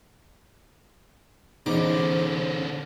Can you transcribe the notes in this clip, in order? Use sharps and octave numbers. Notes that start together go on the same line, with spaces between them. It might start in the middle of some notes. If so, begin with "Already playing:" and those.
E2 D3 C#4 D#4 C5 D6